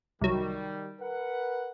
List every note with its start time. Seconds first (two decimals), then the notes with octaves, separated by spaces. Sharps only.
0.21 C2 D#3 F#3 G3
1.00 A#4 B4 F#5